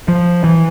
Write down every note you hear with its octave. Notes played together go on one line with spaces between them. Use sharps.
F3
E3